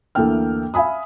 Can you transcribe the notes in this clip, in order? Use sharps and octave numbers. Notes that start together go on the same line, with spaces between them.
D2 E3 A#3 A4 G5 F6
E5 F5 G#5 B5 D#6